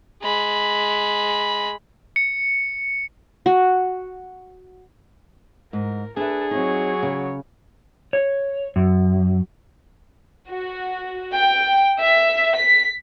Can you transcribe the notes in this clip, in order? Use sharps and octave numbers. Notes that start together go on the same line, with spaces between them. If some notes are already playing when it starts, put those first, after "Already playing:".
G#3 B5
C#7
F#4
G#2 A#4
D4 G#4 A4 B4 E5
F#3 C4 D#4 C#5
C#3
C#5
F#2
F#4
G5
E5
B6